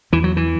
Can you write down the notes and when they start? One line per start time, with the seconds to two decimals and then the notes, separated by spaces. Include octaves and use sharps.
0.12 E2 E3
0.24 F#3
0.37 E3